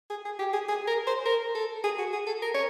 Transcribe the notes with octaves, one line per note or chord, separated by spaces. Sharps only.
G#4
G#4
G4
G#4
G#4
A#4
C5
A#4
A4
G#4
F#4
G#4
A4
A#4
C#5